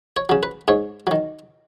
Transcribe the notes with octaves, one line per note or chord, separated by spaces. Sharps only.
C#5
C#3 F#3
B4
G#2 C#5
D#3 F#3